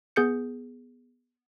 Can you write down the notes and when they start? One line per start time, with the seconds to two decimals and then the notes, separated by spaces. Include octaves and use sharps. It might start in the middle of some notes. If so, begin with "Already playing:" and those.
0.16 B3 G#4 G6 C#7